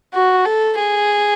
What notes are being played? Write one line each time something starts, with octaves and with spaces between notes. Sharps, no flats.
F#4
A4
G#4